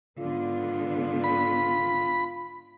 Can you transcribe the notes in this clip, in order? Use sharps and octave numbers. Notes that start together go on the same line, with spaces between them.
G#2 D3 B3 F4
B5